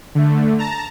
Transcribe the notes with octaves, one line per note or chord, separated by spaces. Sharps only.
D3 A3
A5 A#5